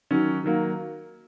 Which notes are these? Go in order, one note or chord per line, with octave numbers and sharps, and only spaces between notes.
D#3 F#3 C#4
D#3 F#3 A#3